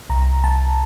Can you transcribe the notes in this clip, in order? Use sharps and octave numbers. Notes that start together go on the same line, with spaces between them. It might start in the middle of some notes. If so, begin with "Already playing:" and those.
C2 A#5
C2 A5